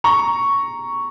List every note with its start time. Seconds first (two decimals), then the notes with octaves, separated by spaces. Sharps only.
0.04 A#5 C#6